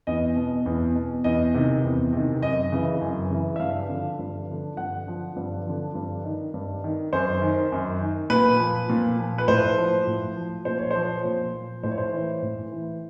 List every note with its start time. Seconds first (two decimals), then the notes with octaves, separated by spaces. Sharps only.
0.07 E2 D#5
0.36 B2
0.66 E2
0.95 B2
1.24 E2 D#5
1.54 C3 D#3
1.84 E2
2.13 C3 D#3
2.42 F#2 D#5
2.72 C#3 E3
3.01 F#2
3.30 C#3 E3
3.56 E5
3.59 G2 F5
3.89 D3 F3
4.19 G2
4.48 D3 F3
4.77 G2 F#5
5.07 D3 F3
5.36 G2
5.65 D3 F3
5.95 G2
6.24 D#3
6.54 G2
6.84 D#3
7.13 F#2 C5
7.42 D#3
7.72 F#2
8.01 D#3
8.30 A#2 B4
8.59 F3
8.90 A#2
9.19 F3
9.38 B4
9.48 A2 C5
9.78 F3
10.07 A2
10.36 F3
10.65 A#2 C5
10.79 C#5
10.91 F3 C5
11.25 A#2
11.54 F3
11.83 A2 C5
11.91 C#5
11.98 C5
12.13 E3
12.42 A2
12.72 E3